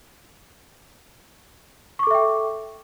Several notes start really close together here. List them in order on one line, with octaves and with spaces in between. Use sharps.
C#6 D6 A4 E5 G5